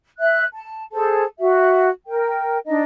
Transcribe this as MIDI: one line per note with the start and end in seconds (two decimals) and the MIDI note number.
0.19 0.44 76
0.19 0.44 90
0.53 0.84 81
0.92 1.23 68
0.92 1.23 69
0.92 1.23 72
0.92 1.23 81
1.39 1.88 66
1.39 1.88 76
2.07 2.57 70
2.07 2.57 79
2.66 2.84 62
2.66 2.84 63
2.66 2.84 75